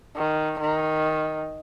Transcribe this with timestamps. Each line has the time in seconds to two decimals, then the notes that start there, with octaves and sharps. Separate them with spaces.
0.17 D#3
0.60 D#3